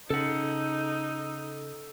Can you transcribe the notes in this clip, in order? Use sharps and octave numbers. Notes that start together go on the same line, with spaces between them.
C#3 D#4 A4 F#5